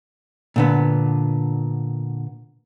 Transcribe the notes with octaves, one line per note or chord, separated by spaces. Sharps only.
A#2 D3 B3